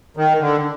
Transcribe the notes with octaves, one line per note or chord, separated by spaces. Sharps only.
D#3
D3